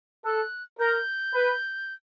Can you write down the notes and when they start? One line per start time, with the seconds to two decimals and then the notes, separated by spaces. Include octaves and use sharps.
0.25 A4 F#6
0.79 A#4 G6
1.34 B4